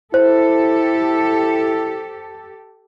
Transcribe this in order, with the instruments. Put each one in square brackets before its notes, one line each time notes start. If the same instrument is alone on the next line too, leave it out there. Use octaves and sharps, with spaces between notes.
[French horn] E4 [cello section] G4 A4 [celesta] C5